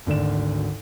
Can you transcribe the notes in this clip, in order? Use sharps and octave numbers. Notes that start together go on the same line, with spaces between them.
G#1 D2 D5 E7